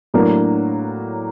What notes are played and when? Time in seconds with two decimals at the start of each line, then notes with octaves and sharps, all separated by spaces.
0.14 A2 F#3 A#3 D4